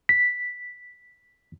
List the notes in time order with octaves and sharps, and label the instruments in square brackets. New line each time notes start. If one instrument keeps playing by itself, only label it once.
[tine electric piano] B6